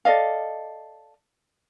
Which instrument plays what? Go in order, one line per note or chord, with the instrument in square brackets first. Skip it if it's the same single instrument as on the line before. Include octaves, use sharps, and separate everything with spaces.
[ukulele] A4 D5 D#5 F5